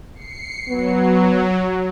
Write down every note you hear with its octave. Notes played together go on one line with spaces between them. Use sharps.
C7 C#7
F#3 B3